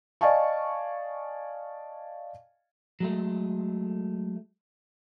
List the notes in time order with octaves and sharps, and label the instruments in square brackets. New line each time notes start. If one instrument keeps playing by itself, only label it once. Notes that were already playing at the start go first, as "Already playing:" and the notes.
[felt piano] D5 D#5 F5 G#5 A5 C#6
[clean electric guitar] F#3 G#3 A3